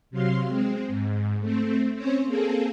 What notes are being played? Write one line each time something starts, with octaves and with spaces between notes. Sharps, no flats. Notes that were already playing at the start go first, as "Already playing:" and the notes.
C3 F#3 F5 C6
G#3 C4
G#2
A3 C4
C4 C#4 C5 C#5
A#3 C4 G#4 A4